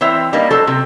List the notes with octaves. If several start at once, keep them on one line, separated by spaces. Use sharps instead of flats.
E3 C4 C#5 E5
G3 A#3 D#4
F#3 A4 C5 A5
C3